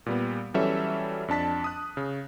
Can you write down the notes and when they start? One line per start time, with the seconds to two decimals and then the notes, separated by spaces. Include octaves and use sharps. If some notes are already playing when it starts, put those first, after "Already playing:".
0.06 A#2 G3 B3
0.54 E3 F#3 G3 C#4 A4 E5
1.28 F2 D4 A5 B6
1.64 D#6 F#6
1.97 C#3